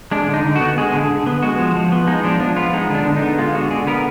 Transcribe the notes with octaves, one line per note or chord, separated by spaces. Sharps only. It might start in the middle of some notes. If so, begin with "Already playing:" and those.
G#3 D4
D3
D#4
D3
F#4
B3
G#3 G#4
D3
D3
B3
G#3 F#4
F3
F3
B3
G#3 D#4
F3 D4
F3 D4
B3 F4
G#3 D#4
D3 D4
D3
D#4
B3
G#3 F4
D3 F#4
D3 G#4
B3 A#4